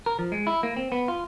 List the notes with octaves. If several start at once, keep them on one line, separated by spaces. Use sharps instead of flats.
A#4
F3
G#3
E4
A#3
C4
B3
F4